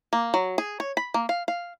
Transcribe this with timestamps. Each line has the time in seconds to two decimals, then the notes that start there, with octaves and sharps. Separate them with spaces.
0.13 A#3
0.34 F#3
0.58 G#4
0.80 C#5
0.97 B5
1.14 A#3
1.29 F5
1.48 F5